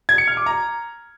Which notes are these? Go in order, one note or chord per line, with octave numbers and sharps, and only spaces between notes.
G#6
C#7
F6
D6
A#5